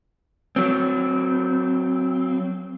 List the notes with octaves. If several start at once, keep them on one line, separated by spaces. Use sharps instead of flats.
F#3 C4